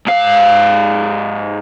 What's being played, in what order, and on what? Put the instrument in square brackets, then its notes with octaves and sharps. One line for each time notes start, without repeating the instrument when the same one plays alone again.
[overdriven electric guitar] G#2 F5